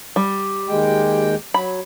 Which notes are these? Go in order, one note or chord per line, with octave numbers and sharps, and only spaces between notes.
G3
D#2 G#3 G5
F#3 B5